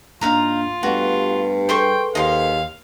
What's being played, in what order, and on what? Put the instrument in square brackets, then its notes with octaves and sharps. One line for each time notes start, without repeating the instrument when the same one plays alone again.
[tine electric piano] G#2 A#3 D4 [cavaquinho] D#4 F5 A#5 [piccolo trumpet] F4
[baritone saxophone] G2 [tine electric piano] A3 B3 G4 [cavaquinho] F#4
[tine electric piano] G#4 A4 B4 [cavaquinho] C5 C6 C#6 [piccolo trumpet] G5
[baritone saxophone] D#2 [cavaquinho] D#5 C6 [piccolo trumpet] F5